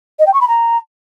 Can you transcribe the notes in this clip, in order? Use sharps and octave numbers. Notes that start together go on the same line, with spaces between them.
D#5
G5
C#6
B5
A#5